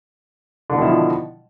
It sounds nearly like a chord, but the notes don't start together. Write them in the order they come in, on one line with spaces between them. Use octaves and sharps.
D3 B2 D#3 E4 F3